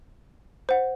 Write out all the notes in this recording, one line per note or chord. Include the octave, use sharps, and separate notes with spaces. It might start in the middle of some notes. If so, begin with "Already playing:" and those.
C5 F#5